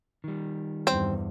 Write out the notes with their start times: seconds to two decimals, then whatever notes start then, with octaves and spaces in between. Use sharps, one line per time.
0.24 D#3 G3
0.87 E2 G2 C4